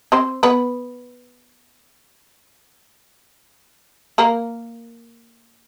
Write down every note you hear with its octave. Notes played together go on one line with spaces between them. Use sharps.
C4 C5
B3 B4
A#3 A#4